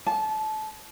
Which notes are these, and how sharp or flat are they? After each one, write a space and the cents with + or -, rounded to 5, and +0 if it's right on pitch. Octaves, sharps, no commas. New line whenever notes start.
A5 -25